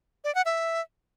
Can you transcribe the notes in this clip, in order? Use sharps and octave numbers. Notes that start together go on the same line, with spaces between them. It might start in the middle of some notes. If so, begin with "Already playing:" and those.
D5
F#5
E5